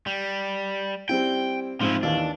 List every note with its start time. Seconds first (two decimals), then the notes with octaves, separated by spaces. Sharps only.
0.07 G3
1.09 G3 C4 E4 G5
1.81 G#2 F3 C4 E4
2.03 D#2 E3 D4 F5